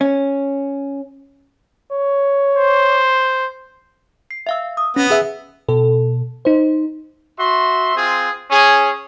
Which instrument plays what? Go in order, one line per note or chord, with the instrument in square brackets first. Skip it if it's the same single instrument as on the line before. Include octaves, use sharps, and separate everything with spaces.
[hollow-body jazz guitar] C#4
[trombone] C#5
[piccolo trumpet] C5
[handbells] C7
E5 F5 E6
D#6
[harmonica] B3 [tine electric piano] C#4
[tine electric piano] G#4 E5
[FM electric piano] B2 A4
D#4 C5
[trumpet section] F#4 E5 C6
C4 F4 G#4
C#4 G#4